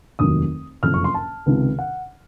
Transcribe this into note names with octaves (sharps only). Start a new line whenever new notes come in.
F1 D#2 D#3 F#3 D#6
F#1 F2 C3 F6
C#6
C6
A5
C#2 C3 D#3
F#5